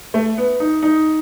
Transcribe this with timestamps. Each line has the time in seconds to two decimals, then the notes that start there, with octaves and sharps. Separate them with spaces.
0.14 A3
0.38 B3
0.60 D#4
0.83 D#4